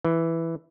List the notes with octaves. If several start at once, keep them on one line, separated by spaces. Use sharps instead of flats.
E3